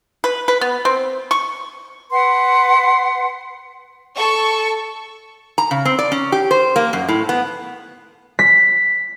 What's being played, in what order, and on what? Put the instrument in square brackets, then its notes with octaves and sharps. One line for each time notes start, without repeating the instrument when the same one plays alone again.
[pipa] B4
B4
B3
C4
C#6
[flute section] B4 F#5 C6
[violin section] A4 C#6
[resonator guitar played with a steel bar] A#5
C#3
C4
D5
C#4
G4
C5
A#3
F#2
A2
B3
[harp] B6